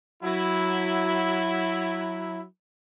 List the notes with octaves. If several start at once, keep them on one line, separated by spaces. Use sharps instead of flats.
F#3 E4